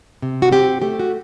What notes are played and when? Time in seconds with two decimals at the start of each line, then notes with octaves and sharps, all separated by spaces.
0.22 C3
0.42 F#4
0.51 C4 G4
0.82 A3 G4
0.99 F#4